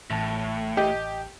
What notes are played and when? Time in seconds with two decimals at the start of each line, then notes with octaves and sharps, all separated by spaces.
0.10 A1 A2 A5
0.77 G4 D#5